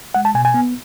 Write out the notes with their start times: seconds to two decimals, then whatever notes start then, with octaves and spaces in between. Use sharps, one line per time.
0.14 G#3 F#5
0.25 A5
0.34 B2 G#5
0.45 G#5
0.54 B3